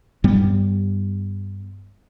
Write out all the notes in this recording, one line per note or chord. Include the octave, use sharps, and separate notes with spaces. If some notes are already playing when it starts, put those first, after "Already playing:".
G2 G3 B3